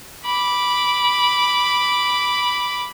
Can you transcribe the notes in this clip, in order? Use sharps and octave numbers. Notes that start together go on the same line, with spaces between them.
B5 D6